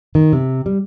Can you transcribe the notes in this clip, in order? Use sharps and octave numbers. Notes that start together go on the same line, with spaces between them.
D#3
C3
G3